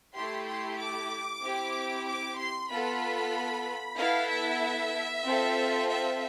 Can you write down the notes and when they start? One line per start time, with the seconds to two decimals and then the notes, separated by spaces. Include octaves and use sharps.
0.15 A3 E4 G4 C6
0.47 C6
0.79 D6
1.43 C4 E4 G4
2.07 D6
2.38 C6
2.70 B3 F4 A4 B5
3.98 B3 E4 A4 F5
4.30 E5
5.25 C4 F4 A4
5.89 E5